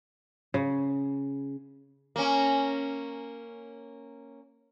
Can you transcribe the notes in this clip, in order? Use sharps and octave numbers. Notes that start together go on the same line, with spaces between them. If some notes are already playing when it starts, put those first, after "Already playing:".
C#3
A#3 C#4